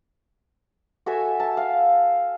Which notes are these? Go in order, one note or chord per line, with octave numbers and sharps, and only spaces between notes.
F#4 A4 E5 G#5
A5
F5